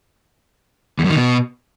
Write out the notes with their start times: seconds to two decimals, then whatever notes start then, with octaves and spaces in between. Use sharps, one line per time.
0.99 E2
1.04 F#2
1.10 D#3
1.16 B2